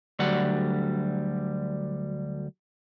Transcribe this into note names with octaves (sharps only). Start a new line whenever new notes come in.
D2 D3 F#3 G3 F#5